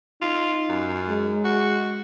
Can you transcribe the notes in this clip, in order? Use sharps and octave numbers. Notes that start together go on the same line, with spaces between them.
D#4 F4
F#2
G#3
F#4